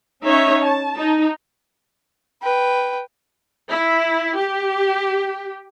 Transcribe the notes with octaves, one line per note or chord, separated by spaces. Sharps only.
C#4 D#4 C#5 E5
A5
D#4
B4 G5
E4
G4